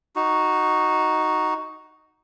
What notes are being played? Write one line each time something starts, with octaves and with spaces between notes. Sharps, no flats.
D#4 F#4